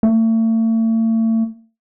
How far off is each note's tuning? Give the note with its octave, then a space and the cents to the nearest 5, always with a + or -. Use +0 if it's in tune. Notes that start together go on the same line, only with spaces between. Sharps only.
A3 +40